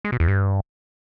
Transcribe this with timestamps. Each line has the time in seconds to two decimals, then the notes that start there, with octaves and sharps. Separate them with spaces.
0.05 G#3
0.12 B2
0.20 E2
0.28 G2